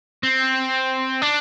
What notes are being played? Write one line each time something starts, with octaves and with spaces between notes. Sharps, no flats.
C4
D4